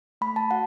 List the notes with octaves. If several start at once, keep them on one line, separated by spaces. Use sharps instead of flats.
A3 B5
A5
F#4 F#5